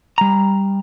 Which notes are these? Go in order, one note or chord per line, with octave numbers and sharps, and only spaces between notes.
G3 A#5